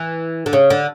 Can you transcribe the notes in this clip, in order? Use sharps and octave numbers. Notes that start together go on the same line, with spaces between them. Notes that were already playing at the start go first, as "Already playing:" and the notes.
Already playing: E3
D3
C#3
D3